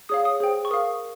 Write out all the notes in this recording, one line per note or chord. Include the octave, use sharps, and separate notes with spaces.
G#4 C#5 F5 D#6
D#6
G#4 C5 G5
C#6
A#4 F5 D#6